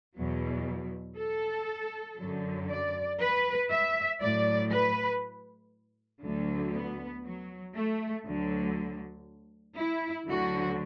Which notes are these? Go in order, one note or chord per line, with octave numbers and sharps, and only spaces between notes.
E2 B2 F#3
A4
F#2 D3 F#3
D5
B4
E5
A2 F#3 D5
B4
D2 D3 F#3
B3
F#3
A3
D2 D3 F#3
E4
D2 D3 F#3 F#4